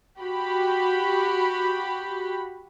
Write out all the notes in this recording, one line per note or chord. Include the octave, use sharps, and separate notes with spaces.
F#4 G4 B5